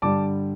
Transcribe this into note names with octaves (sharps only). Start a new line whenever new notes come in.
G2 D3 G3 A5 D6